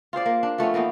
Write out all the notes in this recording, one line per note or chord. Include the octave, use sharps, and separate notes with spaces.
F4 G#4 C5 D5
A#3
D4
F3 A3 B3 C#4
E3 A#3 B3 D#4